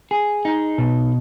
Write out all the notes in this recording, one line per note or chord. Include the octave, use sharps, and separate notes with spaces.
G#4
D#4
B2